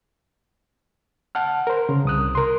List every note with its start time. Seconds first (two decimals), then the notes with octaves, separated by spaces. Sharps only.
1.35 F#5 A5 F6
1.67 A#4 C5
1.89 C#3
2.05 C2 D#6 F#6
2.35 A#4 C6